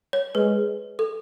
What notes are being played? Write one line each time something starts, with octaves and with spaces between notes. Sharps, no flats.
C#5
G#3 B4
A4